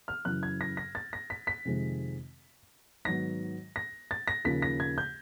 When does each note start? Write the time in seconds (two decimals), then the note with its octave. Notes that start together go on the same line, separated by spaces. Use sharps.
0.08 F6
0.25 F#2 C#3 E3 F#6
0.43 G#6
0.61 A#6
0.77 A#6
0.95 A6
1.13 A#6
1.30 B6
1.47 B6
1.65 F2 C3 D#3 G#3 C4
3.05 G#2 D#3 F#3 B3 A#6
3.76 A#6
4.11 A6
4.28 A#6
4.45 D#2 C#3 F3 A#3 B6
4.62 A#6
4.80 G#6
4.98 G6